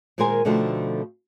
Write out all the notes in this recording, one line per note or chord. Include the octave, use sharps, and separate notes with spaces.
A#2 D#3 G#3 A#4 C5 G#5
B2 D3 F3 A3 D#4 G5